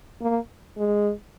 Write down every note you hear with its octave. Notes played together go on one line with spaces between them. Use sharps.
A#3
G#3